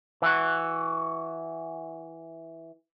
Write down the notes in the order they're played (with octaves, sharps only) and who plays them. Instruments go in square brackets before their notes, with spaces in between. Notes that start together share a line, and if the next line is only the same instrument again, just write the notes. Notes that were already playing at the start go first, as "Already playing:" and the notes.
[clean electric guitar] E3 F#4